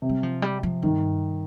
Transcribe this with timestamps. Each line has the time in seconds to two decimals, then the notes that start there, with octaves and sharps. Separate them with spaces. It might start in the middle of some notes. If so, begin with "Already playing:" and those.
0.02 C3
0.09 G3
0.23 F3
0.42 G3
0.63 F3
0.82 G2 D#3